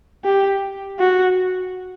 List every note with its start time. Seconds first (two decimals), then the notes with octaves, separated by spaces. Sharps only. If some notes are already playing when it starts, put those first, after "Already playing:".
0.25 G4
0.99 F#4